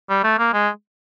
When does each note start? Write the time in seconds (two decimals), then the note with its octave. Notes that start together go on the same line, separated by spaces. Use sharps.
0.09 G3
0.24 A3
0.38 A#3
0.53 G#3